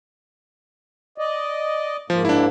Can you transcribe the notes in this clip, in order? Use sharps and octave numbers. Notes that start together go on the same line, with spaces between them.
D5 D#5
G#2 F3 A#3
D4 E4